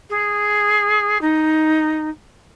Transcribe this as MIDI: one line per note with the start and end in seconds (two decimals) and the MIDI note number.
0.10 1.18 68
1.21 2.09 63